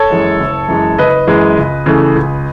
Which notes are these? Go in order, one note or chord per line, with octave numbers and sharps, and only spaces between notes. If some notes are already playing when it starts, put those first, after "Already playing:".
Already playing: A4 C#5
F#2 E3 G#3
F#1
F#2 E3 G#3
F#1 B4 D#5
F#2 E3 G#3
C#2
C#3 E3 A3
C#2